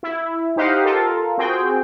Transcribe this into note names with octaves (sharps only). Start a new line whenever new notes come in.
E4
D#4 G4 C5 D#5 F5 F#5
F4 A4 A#4
C4 F#4 G#4 G5